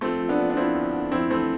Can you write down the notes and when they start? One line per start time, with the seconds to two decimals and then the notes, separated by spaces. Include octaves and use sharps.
0.01 F3 A3 C4
0.20 F3
0.29 B3 D4
0.38 F3
0.50 D4
0.57 F3 C4 E4
0.75 D2
0.94 D3
1.12 F2 C4 E4
1.30 E3 A3 C4